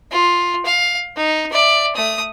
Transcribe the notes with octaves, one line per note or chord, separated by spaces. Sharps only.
F4
F5
D#4
D5 E5
A3 D#6